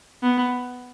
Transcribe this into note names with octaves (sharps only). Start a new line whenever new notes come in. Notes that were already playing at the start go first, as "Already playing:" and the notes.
B3